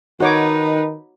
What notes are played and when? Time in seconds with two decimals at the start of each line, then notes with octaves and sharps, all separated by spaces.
0.20 D#3 D#4 F#4 B4 C#5 D6